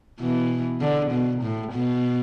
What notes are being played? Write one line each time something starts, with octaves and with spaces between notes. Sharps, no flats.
B2 E3
D3
B2
A2
B2